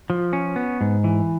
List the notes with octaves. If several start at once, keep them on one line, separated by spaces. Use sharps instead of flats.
F3
C#4
B3
G#2
E3